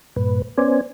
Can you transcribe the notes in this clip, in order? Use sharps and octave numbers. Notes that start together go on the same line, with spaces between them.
G2 A#2 B4
B3 C#4 C5 D5 G#5